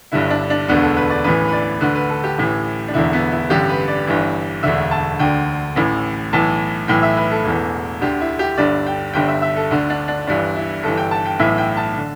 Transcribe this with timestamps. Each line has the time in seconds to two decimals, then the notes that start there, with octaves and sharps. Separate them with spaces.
0.12 G1 G2 D3 E4
0.30 D4
0.50 D4
0.68 E1 D2 D3 B3
0.82 A4
0.97 B4
1.10 D5
1.24 A1 A2 E3 B4
1.48 B4
1.53 D5
1.81 D2 D3 B4
1.95 B4
2.09 A4
2.24 G4
2.38 A1 A2 E3
2.88 D4
2.93 E1 E2 D3 E4
3.13 B3
3.32 E4
3.50 A1 G2 D3 G4
3.69 B4
3.88 D5
4.07 G1 G2 E3
4.63 E1 D2 D3 E5
4.91 A5
5.19 D2 D3 G5
5.75 A1 A2 E3
6.33 B1 A2 E3 A5
6.88 B1 A2 E3 G5
7.02 E5
7.17 B4
7.32 A4
7.45 E1 E2 E3
8.01 D2 D3 G4
8.20 E4
8.39 G4
8.57 G1 G2 D3 D5
8.87 G5
9.14 G1 G2 D3 G5
9.28 E5
9.42 E5
9.57 A4
9.71 D2 D3
9.90 D4
10.08 D4
10.27 G1 G2 E3 D4
10.56 E4
10.83 G1 G2 E3 A4
10.97 G5
11.11 A5
11.26 G5
11.39 B1 A2 E3 E5
11.58 G5
11.77 A5
11.97 D3